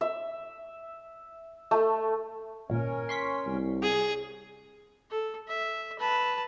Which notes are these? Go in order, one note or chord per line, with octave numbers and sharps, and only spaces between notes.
E5
A3
G#1 A#2 C#4 A#4 C#5
C6 C#6 B6
C2
G#4
A4
E5
B4 A5